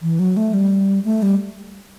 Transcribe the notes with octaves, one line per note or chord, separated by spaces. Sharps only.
E3
F#3
A3
G3
A3
G3